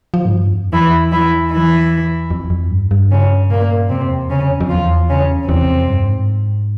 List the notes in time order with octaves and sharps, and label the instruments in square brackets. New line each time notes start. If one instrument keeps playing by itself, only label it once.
[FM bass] F3
G#2
G2
F2
[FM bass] E2 [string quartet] E3 E4
[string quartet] E3 E4
E3 E4
[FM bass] F2
F2
G2
G2
[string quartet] C#3 C#4
A#2 A#3
[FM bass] F2 [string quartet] C3 C4
[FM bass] E2
[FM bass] F2 [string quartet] C#3 C#4
[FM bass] E2
F2
[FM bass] E2 [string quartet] F3 F4
[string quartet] C#3 C#4
[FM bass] F2
[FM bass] E2 [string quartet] C3 C4
[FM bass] F2
G2
G#2